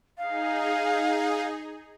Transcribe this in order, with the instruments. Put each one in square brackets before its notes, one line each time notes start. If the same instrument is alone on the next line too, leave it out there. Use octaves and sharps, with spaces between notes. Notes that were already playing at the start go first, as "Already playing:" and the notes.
[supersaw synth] D#4 G#4 [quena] F5